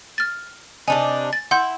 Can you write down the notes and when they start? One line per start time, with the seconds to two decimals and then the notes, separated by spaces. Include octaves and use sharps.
0.18 F6 A6
0.88 C3 D4 D#4 G#5
1.33 A6
1.51 E4 F#5 C6 G6